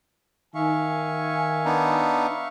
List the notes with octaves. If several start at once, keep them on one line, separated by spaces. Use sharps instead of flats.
D#3 E5 F5 G#5 C#6
B3 D4 D#4